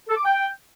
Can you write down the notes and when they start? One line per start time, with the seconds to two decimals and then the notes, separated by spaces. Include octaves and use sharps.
0.08 A4
0.16 D6
0.25 G5